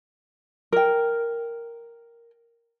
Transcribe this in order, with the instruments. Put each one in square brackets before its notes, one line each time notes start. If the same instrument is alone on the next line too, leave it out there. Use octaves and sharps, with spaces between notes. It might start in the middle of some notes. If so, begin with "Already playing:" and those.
[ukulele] A#4 G5